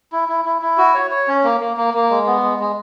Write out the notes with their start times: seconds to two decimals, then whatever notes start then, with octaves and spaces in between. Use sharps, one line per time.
0.12 E4
0.29 E4
0.45 E4
0.62 E4
0.78 F#4
0.94 C#5
1.11 C#5
1.28 C#4
1.44 A#3
1.60 A#3
1.77 A#3
1.94 A#3
2.10 G#3
2.27 B3
2.43 G#3
2.59 G#3